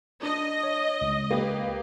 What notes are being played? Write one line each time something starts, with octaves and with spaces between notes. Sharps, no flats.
D4 D#5
C#5
C#2
A#3 G4 B4